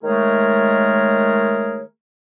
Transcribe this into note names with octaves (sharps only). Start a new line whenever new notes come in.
D#3 G#3 A3 G#4 A#4 C#5